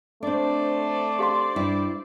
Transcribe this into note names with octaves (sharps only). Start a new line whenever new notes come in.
A3 C4 D4 C5 D5
G4 F5 C6
G2 E4